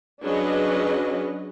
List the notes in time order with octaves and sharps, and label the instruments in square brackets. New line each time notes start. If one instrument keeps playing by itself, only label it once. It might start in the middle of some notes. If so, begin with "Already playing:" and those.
[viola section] F#3 C#4 D4 G#4 B4 D#5